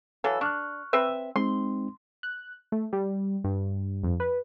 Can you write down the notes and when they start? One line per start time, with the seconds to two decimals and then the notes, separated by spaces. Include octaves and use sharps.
0.24 E3 F#3 A4 F5
0.41 D4 C#6 F6 F#6
0.93 C4 B4 E5
1.36 G#3 C4 D#4 C6
2.23 F#6
2.72 A3
2.93 G3
3.44 G2
4.04 F2
4.20 B4